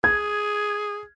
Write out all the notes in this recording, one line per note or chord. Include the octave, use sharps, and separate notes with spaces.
G#4 G#6